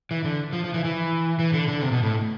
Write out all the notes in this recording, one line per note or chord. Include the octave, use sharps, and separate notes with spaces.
E3
D3
F3
F3
E3
E3
E3
D3
D3
C3
B2
A2